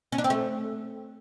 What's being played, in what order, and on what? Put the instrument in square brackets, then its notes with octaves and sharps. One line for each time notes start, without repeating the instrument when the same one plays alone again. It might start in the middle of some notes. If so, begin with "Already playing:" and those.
[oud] C#4
D4
C4
A3